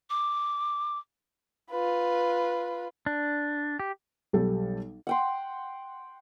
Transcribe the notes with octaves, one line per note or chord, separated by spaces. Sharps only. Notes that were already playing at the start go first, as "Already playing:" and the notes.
D6
F4 B4
D4
G4
B1 G3 G4 A4
F#5 G5 C6